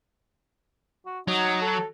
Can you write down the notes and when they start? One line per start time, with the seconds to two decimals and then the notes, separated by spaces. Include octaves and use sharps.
1.06 F#4
1.28 F#3 D#4
1.62 A4